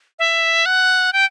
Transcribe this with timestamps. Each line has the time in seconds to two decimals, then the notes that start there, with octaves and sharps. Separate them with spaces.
0.19 E5
0.66 F#5
1.13 G5